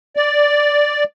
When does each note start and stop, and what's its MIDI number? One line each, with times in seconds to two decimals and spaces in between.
0.17 1.04 74